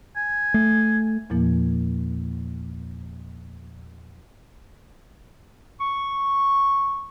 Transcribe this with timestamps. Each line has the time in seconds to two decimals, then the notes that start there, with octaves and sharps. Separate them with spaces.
0.16 G#5
0.54 A3
1.30 E2 A#2 F3 A#3
5.81 C#6